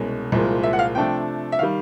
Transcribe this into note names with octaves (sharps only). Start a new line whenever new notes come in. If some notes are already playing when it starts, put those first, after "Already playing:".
Already playing: C2 B2 G#3 C#4
C2 A#2 F3 G#3
E5
F#5
F5
C3 F3 A3 D4 G5
E5
D#3 G3 F5